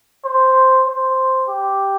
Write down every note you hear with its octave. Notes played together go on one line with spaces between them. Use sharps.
C5
C5
G4